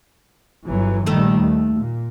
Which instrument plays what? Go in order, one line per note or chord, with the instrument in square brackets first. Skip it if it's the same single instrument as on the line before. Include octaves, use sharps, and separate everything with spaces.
[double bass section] G1 E3 F#3
[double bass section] A#1 D#3 G3 [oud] A3 A4
[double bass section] D#2
A#2